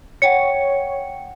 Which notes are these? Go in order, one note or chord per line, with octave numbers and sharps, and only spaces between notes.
C#5 F#5 G5 C#7